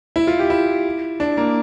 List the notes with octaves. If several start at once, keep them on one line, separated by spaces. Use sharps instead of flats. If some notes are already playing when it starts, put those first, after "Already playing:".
E4
F4
G4
E4
D4
A#3